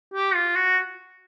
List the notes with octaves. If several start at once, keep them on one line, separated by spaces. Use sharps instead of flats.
G4
F4
F#4